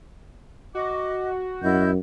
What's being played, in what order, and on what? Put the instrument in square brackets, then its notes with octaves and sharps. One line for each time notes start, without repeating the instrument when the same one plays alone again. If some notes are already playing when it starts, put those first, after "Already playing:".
[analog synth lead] F#4 [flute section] D#5 D6
[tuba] F#2 [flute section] E4 D#5 G6